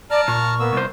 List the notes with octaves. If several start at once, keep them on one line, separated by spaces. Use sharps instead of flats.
D5 A5 A#5 F6
A#2 C#6
A#3 B3 E6
C2 C5